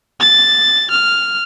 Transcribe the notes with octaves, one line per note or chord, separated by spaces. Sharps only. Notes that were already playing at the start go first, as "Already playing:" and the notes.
A6
F6